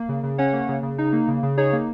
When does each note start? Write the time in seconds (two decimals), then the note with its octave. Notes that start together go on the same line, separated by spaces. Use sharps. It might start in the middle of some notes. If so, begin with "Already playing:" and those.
Already playing: A#3
0.09 C#3
0.23 C#3
0.38 C#4 C#5 F#5
0.53 A#3
0.69 C#3
0.83 C#3
0.98 D#4
1.13 A#3
1.28 C#3
1.43 C#3
1.57 D#4 G#4 C#5
1.73 A#3